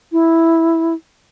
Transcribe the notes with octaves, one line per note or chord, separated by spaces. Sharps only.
E4